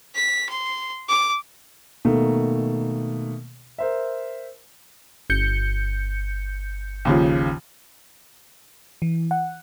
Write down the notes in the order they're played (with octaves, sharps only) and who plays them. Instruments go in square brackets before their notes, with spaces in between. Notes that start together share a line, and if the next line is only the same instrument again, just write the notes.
[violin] B6
C6
D6
[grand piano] B2 D#3 A3 A#3
A#4 C5 E5
[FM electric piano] G1 G6 C#7
[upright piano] D#2 C#3 F3
[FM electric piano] E3
F#5